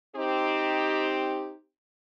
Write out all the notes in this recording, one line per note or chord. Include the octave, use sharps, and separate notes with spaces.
C4 D#4 G4